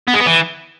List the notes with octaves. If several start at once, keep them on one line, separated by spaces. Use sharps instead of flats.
B3
G#3
B3
E3